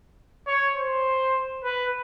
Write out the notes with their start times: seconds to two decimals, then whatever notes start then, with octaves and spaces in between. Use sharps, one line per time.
0.47 C#5
0.76 C5
1.64 B4